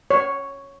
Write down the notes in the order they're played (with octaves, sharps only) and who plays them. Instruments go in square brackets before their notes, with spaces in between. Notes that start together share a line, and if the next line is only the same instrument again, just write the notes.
[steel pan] C#5